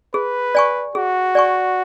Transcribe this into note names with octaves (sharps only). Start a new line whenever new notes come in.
G#4 B4
D5 G#5 C#6
F#4 G#4
D5 G#5 C#6